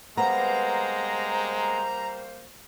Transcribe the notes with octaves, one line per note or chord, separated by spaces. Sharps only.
G3 G#3 A#3 B3 C5 A#5